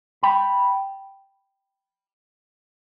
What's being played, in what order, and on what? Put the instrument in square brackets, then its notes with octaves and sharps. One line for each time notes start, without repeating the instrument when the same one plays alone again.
[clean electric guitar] G5 B5